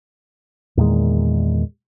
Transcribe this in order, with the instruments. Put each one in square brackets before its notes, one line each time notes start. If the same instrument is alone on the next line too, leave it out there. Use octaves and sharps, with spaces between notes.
[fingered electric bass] E2 A#2 D#3 G#3